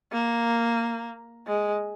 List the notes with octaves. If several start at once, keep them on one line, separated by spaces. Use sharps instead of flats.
A#3
G#3